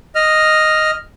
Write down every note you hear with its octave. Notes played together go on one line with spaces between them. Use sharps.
D#5 F6